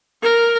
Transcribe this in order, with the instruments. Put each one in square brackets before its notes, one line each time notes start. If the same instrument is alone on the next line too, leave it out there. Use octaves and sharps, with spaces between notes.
[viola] A#4